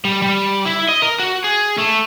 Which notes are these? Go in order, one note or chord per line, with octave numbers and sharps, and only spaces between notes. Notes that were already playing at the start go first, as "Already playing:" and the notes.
G3
G3
E4
D#5
A#4
F#4
G#4
A3